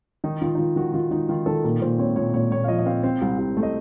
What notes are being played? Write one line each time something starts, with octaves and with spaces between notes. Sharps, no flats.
D#3 D#4
D#3 F4
D#4
D#3 F4
D#3 F#4
D#3 F4
D#3 D#4
D#3 F4
D#3 A4
A#2 A#4
A#2 C5
C4 C#5
A#2 C#5
A#2 C#5
A#2 C#5
F5
F3 D#5
D#5
C4 F5
C4
C2
C2
A3
D#5